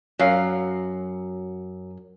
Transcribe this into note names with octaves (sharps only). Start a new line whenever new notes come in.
F#2 F#3 F5